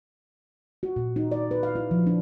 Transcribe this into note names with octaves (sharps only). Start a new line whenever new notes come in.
F#4
A#2
D#4
D5
B4
F5
E4
F3
D4